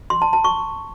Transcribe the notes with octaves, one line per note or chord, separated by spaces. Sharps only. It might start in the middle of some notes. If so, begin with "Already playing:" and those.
C6
A5
A5
C#6